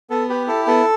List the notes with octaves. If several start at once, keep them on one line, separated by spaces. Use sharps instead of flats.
B3 A4
G4 B4
E4 A4
B3 A4